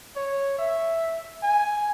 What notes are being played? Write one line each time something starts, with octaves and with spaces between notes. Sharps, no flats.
C#5
E5
G#5